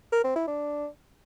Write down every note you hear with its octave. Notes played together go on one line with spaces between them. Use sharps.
A#4
C4
E4
D4